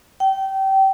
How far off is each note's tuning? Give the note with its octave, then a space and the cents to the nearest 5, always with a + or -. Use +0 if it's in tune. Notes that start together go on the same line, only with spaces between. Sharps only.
G5 -25